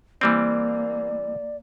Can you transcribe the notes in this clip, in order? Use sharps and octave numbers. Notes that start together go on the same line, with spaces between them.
E3 G3 A#3 C4 D5